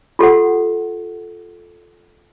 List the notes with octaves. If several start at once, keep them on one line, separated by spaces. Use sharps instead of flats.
F4 G4 A4 F#5